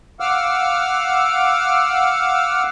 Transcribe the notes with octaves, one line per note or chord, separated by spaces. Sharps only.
F5 F#5 D6 E6 F6